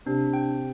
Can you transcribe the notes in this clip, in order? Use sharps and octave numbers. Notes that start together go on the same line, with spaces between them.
C3 D4
G5